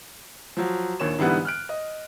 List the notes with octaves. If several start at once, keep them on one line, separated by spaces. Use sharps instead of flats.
F3 F#3
A#1 D#2 C#5 E7
G#2 D3 E3 G3 B3
F6 F#6 D7
D#5